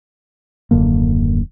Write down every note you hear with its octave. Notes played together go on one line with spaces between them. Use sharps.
D#1 F#2 D3 A#3